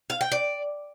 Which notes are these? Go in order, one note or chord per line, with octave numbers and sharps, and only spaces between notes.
F5
G5
D5